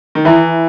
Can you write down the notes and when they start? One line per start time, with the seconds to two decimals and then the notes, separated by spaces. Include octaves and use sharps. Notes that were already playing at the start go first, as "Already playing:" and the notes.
0.15 D#3
0.25 E3 E4 A4 E5 B5